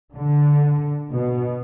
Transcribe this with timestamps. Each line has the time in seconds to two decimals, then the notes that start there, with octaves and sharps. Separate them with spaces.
0.16 D3
1.10 B2